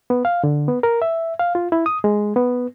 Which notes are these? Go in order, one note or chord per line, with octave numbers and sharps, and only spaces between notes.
B3
F5
D3
B3
A#4
E5
F5
F4
E4
D#6
G#3
B3